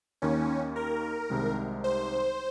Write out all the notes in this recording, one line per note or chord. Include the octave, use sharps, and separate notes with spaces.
D#2 D#3 A#3 C#4
A#4
C2 C3 D#3 G#3
C5